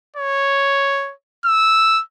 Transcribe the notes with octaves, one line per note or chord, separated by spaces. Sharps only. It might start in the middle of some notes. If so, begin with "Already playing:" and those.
C#5
E6